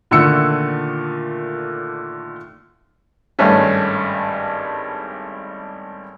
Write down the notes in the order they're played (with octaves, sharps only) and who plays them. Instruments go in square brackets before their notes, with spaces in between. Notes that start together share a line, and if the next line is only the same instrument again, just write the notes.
[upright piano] A#2 D3 D#3 A3 E6 C#7
[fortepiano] G#1 G2 A3 C#4